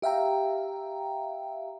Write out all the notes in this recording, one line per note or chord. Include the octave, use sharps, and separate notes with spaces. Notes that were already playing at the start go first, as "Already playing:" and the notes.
G4 E5 F5 G5 A#5